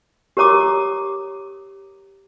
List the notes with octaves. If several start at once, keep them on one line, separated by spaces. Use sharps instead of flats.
G4 A#4 C#5 A#5 D6 D#6